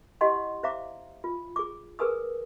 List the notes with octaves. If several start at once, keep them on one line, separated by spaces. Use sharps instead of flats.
E4 G4 D#5 F#5 G#5 C6
C5 E5 F5 A#5 D6
F4
G#4 D6
G#4 A#4 B4 G#5 D#6 E6